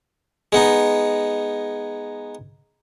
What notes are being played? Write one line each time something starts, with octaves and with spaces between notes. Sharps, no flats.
G#3 B3 D#4